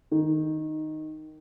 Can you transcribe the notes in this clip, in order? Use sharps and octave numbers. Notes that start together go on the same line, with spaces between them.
D#3